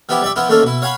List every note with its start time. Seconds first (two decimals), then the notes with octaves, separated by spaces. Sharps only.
0.09 F3 B3 E4 G4
0.22 G3 D5 E5
0.36 F3 B3 E4 F4
0.49 D#3 A3 A#3 C#4 F4 A4
0.63 B2 E4
0.82 C#5 F5 F#5 G#5 B5